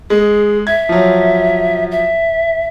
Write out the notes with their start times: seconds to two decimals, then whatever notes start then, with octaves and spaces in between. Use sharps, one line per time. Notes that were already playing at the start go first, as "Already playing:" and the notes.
0.10 G#3 G#4
0.67 E5 G#6
0.89 F3 F#3
1.91 E5